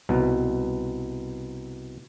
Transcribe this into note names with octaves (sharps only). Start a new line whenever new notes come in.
C2 B2